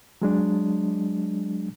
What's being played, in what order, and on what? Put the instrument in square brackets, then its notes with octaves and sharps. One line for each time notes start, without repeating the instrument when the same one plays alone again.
[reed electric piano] F#3 G#3 D4